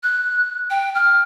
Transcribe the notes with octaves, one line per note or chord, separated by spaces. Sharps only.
F#6
G5
F6